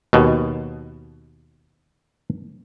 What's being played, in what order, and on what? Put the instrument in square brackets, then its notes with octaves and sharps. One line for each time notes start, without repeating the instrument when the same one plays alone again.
[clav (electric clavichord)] D#2 B2